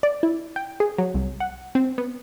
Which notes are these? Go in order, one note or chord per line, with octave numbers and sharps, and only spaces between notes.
D5
E4
G5
G#4
F#3
C2
F#5
C4
B3